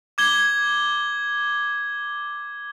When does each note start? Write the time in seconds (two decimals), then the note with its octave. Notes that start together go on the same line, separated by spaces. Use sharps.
0.18 D6 G#6 G7